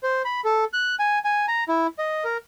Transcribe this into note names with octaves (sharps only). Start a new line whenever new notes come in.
C5
B5
A4
F#6
G#5
G#5
A#5
E4
D#5
A#4